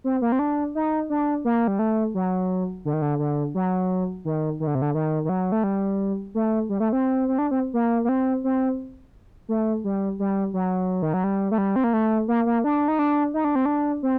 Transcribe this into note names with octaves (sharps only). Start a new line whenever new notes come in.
C4
A#3
C4
D4
D#4
D4
A#3
G3
A3
F#3
D3
D#3
D3
D3
F#3
D#3
D#3
D3
C3
D3
D#3
D#3
F#3
A3
G3
A3
G3
A3
C4
C4
D4
C4
A#3
A#3
C4
C4
A3
G3
G3
F#3
D#3
F#3
G3
A3
G3
C4
A#3
A3
A#3
A#3
D4
D#4
D4
D#4
D4
C4
D4
C4